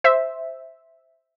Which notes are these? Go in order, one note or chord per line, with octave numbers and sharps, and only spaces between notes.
C5 E5